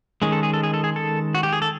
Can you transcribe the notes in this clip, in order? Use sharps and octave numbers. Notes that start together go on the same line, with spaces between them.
D#3 G#3 C#4 G#4
A4
G#4
A4
G#4
A4
G#4
A4
F#4
G4
G#4
A4